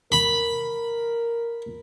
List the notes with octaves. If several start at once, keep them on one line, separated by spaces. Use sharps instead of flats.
A#4 B5